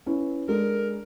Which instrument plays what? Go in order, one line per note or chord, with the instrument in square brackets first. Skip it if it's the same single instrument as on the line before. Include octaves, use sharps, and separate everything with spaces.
[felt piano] C#4 E4 B4
[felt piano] G#3 D4 A4 [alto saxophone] A#4